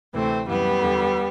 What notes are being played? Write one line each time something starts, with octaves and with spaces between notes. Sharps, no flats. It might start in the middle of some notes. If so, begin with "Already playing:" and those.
D2 C3 E3 A3 C4
F#2 E3 G3 B3
E2 D3